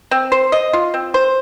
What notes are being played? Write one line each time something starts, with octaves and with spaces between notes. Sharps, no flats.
C4
C5
D#5
F4
C4
C5